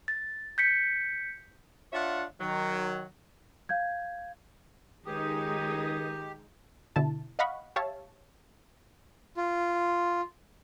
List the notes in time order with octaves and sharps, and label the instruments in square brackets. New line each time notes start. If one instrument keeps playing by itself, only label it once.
[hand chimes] A6
G6 B6 C#7
[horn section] D4 F4 C#5 E5 F#5
D#3 F#3
[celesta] F5 G6 G#6
[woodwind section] C#2 G#4 D#6 [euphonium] D#3 [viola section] G#3 D#4 [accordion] G4
[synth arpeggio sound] B2 D3 E4 A5
D#5 F5 F#5 B5 C#6
G4 C#5 E5 F5 A5
[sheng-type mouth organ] F4